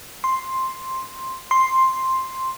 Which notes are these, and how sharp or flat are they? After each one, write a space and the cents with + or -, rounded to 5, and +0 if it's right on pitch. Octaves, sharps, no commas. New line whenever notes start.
C6 +5
C6 +5